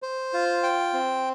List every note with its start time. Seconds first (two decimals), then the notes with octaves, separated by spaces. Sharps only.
0.02 C5
0.33 F4
0.63 G5
0.93 C4